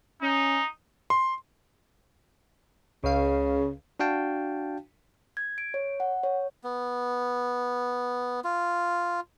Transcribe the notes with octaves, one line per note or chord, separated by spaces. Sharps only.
C#4 D#4
C6
C#2 C#3 F5
D4 F#4 F5 G5 A5
G#6
D7
C#5
F#5
C#5
B3
F4